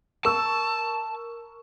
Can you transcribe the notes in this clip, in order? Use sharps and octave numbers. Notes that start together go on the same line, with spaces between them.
A#4 A5 C#6 E6